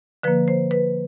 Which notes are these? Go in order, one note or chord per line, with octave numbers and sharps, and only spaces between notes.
D3 F3 A#3 B4
C5
B4